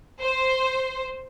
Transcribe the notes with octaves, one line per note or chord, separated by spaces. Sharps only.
C5